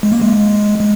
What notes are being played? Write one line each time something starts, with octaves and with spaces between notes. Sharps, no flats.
G#3
A#3
G#3
G#3